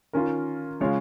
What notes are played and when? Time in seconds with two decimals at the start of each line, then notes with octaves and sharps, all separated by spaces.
0.13 D#3 C#4 F4 A#4
0.81 C#3 G#3 C#4 F4 C#5